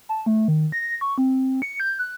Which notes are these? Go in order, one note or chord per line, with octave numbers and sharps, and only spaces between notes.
A5
A3
D#3
A#6
C#6
C4
C#7
G6
F#6